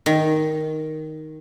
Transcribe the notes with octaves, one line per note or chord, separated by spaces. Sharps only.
D#3